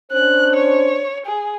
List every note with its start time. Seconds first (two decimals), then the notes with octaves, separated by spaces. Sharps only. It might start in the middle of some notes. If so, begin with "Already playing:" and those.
0.12 C#4 D4 C5 F#6
0.56 C#5
1.26 G#4